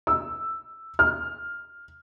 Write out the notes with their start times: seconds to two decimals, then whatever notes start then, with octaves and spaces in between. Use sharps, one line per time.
0.07 E6
0.99 F6